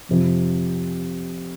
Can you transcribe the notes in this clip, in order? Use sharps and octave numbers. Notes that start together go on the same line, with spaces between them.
F2 C3 F3